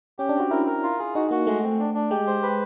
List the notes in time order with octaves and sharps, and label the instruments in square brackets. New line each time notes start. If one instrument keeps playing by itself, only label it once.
[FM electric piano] C#4 [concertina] G4
[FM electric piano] D4
[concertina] C4 [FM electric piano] F#4
[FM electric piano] E4 [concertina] A#4
[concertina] A#4
F4
G#4
[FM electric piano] D#4 [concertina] F#4
[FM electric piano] A#3 [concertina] F#4
[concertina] G#3 [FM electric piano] A3
[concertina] C4
D4
D4
[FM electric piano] G#3 [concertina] G4
[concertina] C5
B4